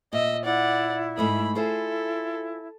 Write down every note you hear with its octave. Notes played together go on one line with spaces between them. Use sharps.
A#2 D#5 E5
E4 D5 F#5
G#2 A3 D#5 B5
E4 F4 G#4 A4 C5